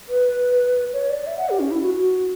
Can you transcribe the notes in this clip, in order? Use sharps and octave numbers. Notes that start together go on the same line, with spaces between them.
B4
C#5
D5
E5
F#5
G4
C#4
E4
F#4
F#4